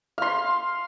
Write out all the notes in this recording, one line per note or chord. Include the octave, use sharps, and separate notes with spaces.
F5 C6